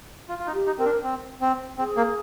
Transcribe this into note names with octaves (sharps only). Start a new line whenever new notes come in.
F4
F4
D#4
G4
D#4
C4 A#4
D4
C4
C4
C4 G#4
A#3